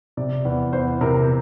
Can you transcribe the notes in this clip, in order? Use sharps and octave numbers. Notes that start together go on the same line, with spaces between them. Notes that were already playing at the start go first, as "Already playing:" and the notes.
C3 D5
E2
E2 C5
C3 A#4
A#4